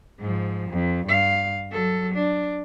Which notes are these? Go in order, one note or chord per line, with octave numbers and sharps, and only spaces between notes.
G#2 F3
F2
G2 F5
F#3 A4
D4